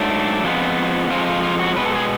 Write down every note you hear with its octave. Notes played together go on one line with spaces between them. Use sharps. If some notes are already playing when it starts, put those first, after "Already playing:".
Already playing: G#2 F#3 A3 D4
F2 F3 G#3 B3
F2 F3 G#3 F4
F4
F4
F#4
B2 G#3 B3 B4
A4
G#4